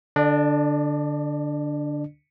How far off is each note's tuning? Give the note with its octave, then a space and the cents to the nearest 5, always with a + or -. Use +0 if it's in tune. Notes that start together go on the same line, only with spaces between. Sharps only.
D3 +0 D4 -5 D5 +40